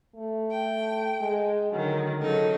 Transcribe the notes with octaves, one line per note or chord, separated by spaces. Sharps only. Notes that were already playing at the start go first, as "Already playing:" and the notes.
A3
G5
G#3
D3 D#3 F#3
C#3 F#3 D#4 A4